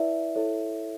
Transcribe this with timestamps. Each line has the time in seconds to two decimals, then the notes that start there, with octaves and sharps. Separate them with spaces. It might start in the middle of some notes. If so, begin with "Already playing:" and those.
Already playing: E4 B4 D5 E5
0.35 E4 A4 C#5